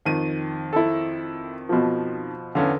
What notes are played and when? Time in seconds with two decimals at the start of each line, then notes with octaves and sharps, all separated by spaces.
0.06 F2 D#3 D#7
0.73 E4 A4
1.69 B2 F3
2.55 E2 D3 C#4 F5